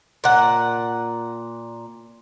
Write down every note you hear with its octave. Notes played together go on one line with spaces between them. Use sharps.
A#2 F#5